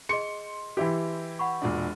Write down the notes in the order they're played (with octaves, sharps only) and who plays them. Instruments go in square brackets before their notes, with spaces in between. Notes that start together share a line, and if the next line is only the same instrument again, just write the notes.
[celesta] G#4 D#5 [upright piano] C6 [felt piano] C#7
[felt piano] E3 E4 G4
[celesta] F#5 B5 C#6
[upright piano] E1 A#2 D4